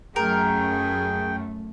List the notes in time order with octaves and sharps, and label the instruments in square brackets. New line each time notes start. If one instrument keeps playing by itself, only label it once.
[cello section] F#2 A3 [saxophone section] G#4 [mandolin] A#4 [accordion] G5